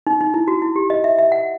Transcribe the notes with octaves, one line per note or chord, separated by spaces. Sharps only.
D#4
D#4
E4
F#4
E4
G4
D#5
E5
E5
F#5